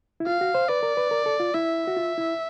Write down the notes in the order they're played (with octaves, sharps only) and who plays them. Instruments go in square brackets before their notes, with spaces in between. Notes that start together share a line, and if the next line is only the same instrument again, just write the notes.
[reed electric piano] E4
[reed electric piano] F4 [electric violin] F5
[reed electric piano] F#4
C5
[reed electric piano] B4 [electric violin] D5
[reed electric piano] A#4
B4
A#4
A4
F4
[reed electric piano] E4 [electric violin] E5
[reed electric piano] F#4
F4
E4